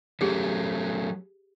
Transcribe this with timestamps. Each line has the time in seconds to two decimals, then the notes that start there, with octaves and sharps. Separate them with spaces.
0.21 F#3 A3 C#4 G4 G#4